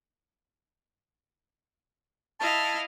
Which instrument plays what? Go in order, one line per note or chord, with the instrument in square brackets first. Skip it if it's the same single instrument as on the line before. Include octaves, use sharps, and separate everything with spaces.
[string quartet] E4 D#5 F5 [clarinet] A5